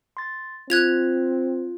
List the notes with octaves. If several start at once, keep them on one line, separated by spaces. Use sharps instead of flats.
C6 A6
C4 F4 F#6 G#6 F7